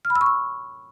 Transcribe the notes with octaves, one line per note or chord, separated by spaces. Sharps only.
F6
B5
E6
C#6
E6